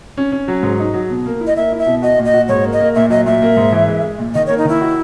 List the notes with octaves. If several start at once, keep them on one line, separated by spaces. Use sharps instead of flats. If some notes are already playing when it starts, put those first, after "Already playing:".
C#4
C#4
F#3
G#2
D#4
F#3
B2
A#3
E4
D#5
A#3 E5
E4
E5
B2
F#4 D#5
A#2
D#5
F#4
G#2 C#5
A#3
D#5
A#3
A#2 E5
F#3 D#5
A#2 E5
A#3
G#2
E3
G#3
G#3
A#2
D#3 D#5
A#3 C#5
D#4
D#3 E4
F#4